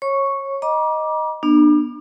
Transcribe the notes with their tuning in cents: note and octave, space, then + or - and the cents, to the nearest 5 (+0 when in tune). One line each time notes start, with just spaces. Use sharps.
C#5 -25 C#6 +0
D#5 +0 A#5 +40 D6 +0
B3 -25 D4 +35